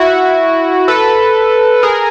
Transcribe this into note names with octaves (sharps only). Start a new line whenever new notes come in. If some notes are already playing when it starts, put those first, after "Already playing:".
Already playing: E4 F#4
A4 B4
G#4 A#4